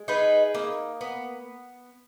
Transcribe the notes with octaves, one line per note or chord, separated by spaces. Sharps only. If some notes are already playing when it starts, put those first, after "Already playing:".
Already playing: G#3
D#4 G#4 B4
A#3
B3